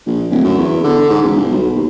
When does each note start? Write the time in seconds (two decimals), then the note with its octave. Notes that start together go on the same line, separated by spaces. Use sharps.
0.06 A#1
0.30 D1
0.44 F#2
0.58 E2
0.84 D3
1.10 G#2
1.23 E1
1.36 G1
1.51 B1
1.75 D#2